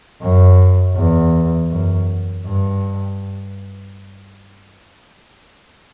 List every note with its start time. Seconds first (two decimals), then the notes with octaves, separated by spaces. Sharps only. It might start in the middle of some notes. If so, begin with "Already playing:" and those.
0.22 F#2
0.96 E2
1.70 F#2
2.46 G2